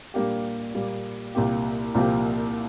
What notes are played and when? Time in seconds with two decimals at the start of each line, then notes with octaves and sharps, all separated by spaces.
0.14 A#2 G3 A#3 D4 G4
0.74 A#2 G3 A#3
1.35 C2 A#2 A#3 G4
1.95 C2 A#2 F3 A#3 G4